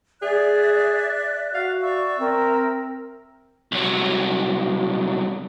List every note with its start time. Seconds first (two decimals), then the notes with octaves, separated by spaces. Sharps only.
0.22 G#4 D5 E5 F#6
1.54 F#4 F5
1.82 D5 E5 C#6
2.19 C4 A#4
3.72 C2 F#3